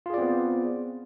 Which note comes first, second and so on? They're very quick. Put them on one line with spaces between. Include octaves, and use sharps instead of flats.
F4 G#4 D5 C4 B3